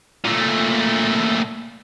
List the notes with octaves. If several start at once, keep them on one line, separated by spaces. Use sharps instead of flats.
A#2 A3